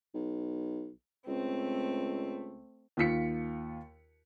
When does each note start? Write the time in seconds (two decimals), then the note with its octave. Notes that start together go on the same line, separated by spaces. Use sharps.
0.14 B1
1.27 C#2 A3 C4
2.97 D#2 F4 B6 C#7